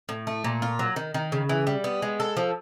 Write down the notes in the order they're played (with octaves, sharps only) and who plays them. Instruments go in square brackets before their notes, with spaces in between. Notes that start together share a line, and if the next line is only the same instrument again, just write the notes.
[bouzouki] A2
A3
A#2
F4
F#3
D#3
D#3
C#3
E3
G3
B3
G#3
A4
F3